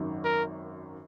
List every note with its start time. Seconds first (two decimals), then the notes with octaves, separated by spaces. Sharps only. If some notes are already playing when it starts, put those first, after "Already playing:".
Already playing: G#1 F#2 D#3
0.24 A#4